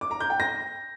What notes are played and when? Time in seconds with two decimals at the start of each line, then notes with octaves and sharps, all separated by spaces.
0.01 D6
0.11 A#5
0.20 G6
0.30 G5
0.40 A#6